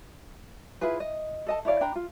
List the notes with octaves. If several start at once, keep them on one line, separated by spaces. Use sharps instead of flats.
E4 F4 G#4 B4
D#5
A4 D#5 A5
E4 C#5 D5 F5
D4 G5 A#5 B5
F4